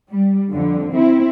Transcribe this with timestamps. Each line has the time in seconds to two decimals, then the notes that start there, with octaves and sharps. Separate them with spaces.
0.12 G3
0.52 F2 D3
0.94 C4 E4